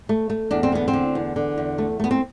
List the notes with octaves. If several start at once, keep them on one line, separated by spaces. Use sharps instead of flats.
A3
A3
E2 D4
C4
D3 B3
C4
D3
E2
D3
E2
A3
A3 B3
C4